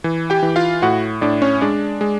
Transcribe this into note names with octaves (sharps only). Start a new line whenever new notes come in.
E3
G4 G5
E3
F4 F5
A2 F#4 F#5
A2 D4 D5
C#4 C#5
G#3 D4 D5
G#3